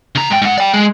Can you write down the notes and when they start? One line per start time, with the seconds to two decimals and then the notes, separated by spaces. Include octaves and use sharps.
0.15 C#3 A#5
0.30 G#2 G5
0.42 G#2 F#5
0.58 D5 G5
0.74 G#3